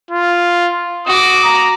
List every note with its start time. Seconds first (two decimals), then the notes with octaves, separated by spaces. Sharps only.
0.11 F4
1.07 F#4 D6 D#6
1.44 A#5